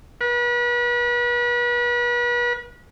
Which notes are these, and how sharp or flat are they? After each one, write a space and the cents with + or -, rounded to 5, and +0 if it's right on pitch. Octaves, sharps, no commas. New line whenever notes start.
B4 -35